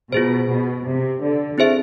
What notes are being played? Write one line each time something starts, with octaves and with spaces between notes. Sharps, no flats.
B2 F4 G#4 C5
B2
C3
D3
C4 E4 G#4 C5 E5